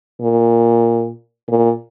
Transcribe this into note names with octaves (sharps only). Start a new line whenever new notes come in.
A#2
A#2